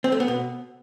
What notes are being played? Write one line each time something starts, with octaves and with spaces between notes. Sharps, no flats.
C4
A3
B3
B2